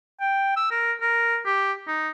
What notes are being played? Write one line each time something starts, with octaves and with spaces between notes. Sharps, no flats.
G5
E6
A#4
A#4
G4
D#4